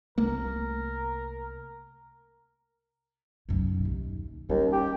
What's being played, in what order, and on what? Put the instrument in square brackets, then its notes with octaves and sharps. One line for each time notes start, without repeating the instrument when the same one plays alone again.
[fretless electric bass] C2 A3 A#3 [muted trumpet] A#4
[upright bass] B1 F#2
D#2
[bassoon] D#2 [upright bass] G3 C#4
[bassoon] G4